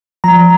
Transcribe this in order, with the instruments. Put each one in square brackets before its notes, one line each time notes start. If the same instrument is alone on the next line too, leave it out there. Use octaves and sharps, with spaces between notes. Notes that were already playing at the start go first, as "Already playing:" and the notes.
[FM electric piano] F3 A#5